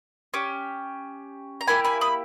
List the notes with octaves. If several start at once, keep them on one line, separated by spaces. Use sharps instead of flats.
C#4 G4
A#5
A#3 E4 G4 G#5 B5
G#5 B5
B5 D#6